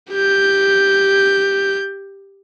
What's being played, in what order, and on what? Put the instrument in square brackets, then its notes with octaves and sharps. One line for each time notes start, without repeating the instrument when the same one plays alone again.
[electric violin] G4 G6